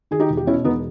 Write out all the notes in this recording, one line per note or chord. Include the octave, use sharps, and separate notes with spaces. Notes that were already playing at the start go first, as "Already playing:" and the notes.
D#3 G#4
D#4 G4
E1
G4
B2 C#4 E4
E1 B3 D#4